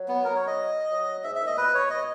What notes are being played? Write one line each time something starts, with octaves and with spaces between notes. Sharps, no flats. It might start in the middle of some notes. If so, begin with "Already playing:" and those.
Already playing: F#3
B3
A#4
C#5
D#5
F#3
G#2 E5
E5
A#2
D#5
B2 B4
C#5
D#5